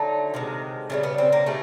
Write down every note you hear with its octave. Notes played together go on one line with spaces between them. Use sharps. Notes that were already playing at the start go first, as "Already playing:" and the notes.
Already playing: D3 F#3 A3 D#4
C3 D#3 G#3
C#3 E3 G3 A3
B3
C4
A#3
D#3 G3 A3